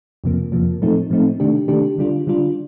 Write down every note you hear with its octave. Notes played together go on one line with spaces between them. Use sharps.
F2 C3 F3 A#3
F2 C3 F3 A#3
A2 F3 A3 C4 D#4
A2 F3 A3 C4 D#4
C3 D#3 A3 D4 G4
C3 D#3 A3 D4 G4
D3 G3 D4 F4
D3 G3 D4 F4